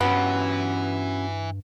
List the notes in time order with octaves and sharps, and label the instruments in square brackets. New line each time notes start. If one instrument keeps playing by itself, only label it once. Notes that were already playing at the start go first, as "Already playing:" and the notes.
[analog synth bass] G2 [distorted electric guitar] E3 [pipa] B3 [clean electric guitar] C#4 F#4 G4